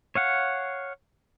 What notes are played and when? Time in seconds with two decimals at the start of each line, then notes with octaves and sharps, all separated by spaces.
0.15 C#5 F5 F#5